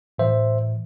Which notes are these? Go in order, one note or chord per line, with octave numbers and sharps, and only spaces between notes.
A2 E3 C5 E5